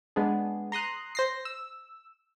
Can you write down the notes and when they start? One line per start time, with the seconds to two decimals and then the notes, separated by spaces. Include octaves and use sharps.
0.16 G#3 B3 D4 G#4
0.72 A#5 C6 D#6 F#6
1.15 C5 A#6 C7
1.45 E6